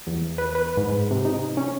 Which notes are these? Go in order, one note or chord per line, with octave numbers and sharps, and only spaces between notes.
E2
B4
B4
G#2
C3
D#4
C#4